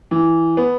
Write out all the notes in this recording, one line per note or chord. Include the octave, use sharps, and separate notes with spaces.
E3
B3